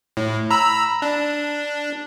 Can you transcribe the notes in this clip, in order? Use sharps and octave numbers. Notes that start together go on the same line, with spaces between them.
A2
A#5 B5 E6
D4